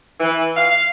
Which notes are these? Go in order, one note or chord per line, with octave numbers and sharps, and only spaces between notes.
E3
F5